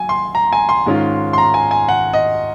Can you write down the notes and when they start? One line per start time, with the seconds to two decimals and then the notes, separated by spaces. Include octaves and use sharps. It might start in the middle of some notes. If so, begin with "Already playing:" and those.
Already playing: F#3 G#5
0.09 C6
0.35 A#5
0.53 G#5
0.69 C6
0.86 G#2 D#3 G#3 C#4 F4
1.33 C6
1.38 A#5
1.54 G#5
1.71 G#5
1.89 F#5
2.13 D#5